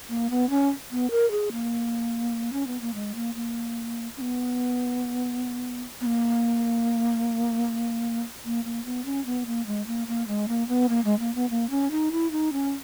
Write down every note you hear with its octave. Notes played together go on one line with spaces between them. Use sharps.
A#3
B3
C#4
B3
A#4
G#4
A#3
C#4
B3
A#3
G#3
A#3
A#3
C#4
B3
B3
A#3
A#3
A#3
B3
C#4
B3
A#3
G#3
A#3
A#3
G#3
A#3
B3
A#3
G#3
A#3
B3
A#3
C#4
D#4
E4
D#4
C#4